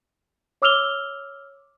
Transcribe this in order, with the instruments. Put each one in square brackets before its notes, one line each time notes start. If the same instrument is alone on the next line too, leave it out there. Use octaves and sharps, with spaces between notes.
[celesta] C#5 D6 E6 F6 F7 G7